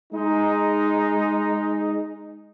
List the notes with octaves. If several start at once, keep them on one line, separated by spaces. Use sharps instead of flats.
G#3 D#4